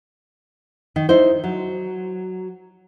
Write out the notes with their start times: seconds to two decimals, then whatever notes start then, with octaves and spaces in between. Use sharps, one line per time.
0.96 D#3
1.09 D#4 E4 C5
1.44 F#3